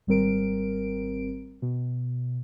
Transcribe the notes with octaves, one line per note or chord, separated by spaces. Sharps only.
G#1 G3 C4 A#4 D7
B2